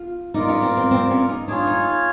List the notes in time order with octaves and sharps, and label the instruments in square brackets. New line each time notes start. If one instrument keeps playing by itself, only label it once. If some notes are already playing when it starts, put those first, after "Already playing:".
Already playing: [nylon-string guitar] F4
[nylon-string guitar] D#4 [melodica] F4 A#4 D5
[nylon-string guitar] C#4
C4
C4
C4
C#4
D#4
[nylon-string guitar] D4 [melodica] F4 G#4 C#5
[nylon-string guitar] D#4